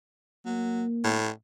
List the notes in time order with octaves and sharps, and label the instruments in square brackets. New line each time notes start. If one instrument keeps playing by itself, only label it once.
[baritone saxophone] F#3 [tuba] A#3
[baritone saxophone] A2